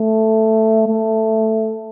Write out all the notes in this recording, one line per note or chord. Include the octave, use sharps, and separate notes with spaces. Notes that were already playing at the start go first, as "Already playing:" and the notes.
Already playing: A3
A3